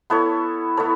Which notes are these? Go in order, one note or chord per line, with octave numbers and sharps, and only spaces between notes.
B3 E4 A4 C#5
B3 E4 A4 C#5